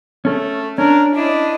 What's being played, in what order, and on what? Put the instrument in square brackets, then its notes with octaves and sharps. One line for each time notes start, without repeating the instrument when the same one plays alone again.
[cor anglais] A3 [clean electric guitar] C#4 A4
[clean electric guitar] C#4 [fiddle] D4 [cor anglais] A#4
[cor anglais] D4 [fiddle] E4 D#5